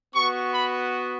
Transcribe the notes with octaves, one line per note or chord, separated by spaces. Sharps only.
B3 F#4 C#6
B5